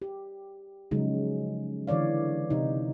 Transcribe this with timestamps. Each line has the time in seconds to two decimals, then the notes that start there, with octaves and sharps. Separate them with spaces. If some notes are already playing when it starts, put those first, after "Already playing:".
0.02 G4
0.91 C#3 F3 F#3 G#3 D#4
1.87 D3 E3 C#5 D5 F5
2.50 C3 D#4